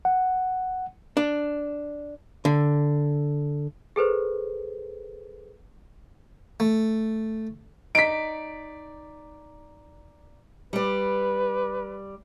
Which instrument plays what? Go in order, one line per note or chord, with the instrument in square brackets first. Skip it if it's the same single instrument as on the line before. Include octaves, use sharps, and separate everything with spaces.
[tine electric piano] F#5
[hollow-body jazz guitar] D4
D3
[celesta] G#4 A4 B4 C5
[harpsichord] A3
[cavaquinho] D#4 D5 [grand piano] B6 D7
[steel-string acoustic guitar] G3 D5 [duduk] B4